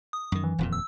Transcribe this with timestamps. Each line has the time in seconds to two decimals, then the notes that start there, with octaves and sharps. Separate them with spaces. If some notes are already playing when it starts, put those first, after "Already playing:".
0.13 D#6
0.32 F#2 D#3
0.44 E3
0.58 D#1 F2 A#2
0.73 E6